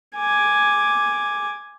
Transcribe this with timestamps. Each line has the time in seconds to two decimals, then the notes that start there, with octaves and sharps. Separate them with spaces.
0.16 G#5 D6